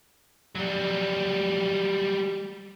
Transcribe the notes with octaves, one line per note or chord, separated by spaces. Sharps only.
F#3 G3